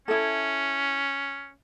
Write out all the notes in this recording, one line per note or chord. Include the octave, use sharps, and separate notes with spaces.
C#4 E4 A4